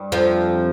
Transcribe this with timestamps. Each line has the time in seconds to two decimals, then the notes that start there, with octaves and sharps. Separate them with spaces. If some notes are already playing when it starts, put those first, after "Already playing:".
Already playing: G2 G3
0.12 F2 C3 F3 C4